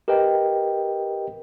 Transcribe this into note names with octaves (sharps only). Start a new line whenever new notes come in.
G4 A#4 B4 D#5 G5